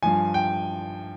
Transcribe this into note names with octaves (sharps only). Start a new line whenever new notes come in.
G2 F3 G#5
G5